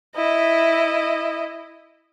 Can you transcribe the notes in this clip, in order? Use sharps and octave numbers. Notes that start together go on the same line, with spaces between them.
E4 D#5